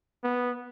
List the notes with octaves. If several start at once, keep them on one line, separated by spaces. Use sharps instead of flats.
B3